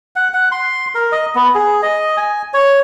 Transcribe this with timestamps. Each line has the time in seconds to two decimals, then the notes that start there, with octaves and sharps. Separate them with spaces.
0.16 F#5
0.34 F#5
0.52 C6
0.95 A#4
1.12 D#5
1.35 B3
1.55 G#4
1.83 D#5
2.17 G#5
2.54 C#5